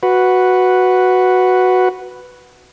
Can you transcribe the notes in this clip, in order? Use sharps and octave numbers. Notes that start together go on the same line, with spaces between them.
F#4 B4